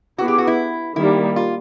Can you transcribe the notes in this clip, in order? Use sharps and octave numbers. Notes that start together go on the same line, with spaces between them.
B3 E4 F#4 G#4 B4
G4
F#4
E4
D#3 G3 A#3 E4
F4